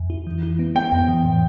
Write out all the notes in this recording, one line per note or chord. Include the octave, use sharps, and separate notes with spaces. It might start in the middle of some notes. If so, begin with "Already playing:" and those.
Already playing: F2
E4
E3
E4
B3
B3 G5
F2
E3
A2